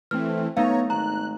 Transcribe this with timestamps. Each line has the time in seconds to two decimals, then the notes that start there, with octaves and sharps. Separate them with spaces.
0.11 E3 A3 C4 F6
0.57 A3 B3 D#4 C#5 F5 A#5
0.90 G#1 A#5 F#6